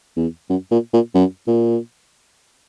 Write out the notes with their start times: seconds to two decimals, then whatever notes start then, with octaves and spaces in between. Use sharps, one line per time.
0.17 E2
0.49 F#2
0.71 A#2
0.93 A#2
1.14 F#2
1.47 A#2